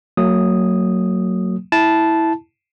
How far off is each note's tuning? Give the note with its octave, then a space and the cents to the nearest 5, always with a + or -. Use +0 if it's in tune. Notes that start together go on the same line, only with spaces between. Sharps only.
F#3 +0 A#3 -40 D#6 +0
E4 -10 A5 -10